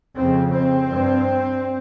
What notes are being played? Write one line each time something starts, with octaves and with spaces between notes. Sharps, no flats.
F2 C#3 C4
C4
G2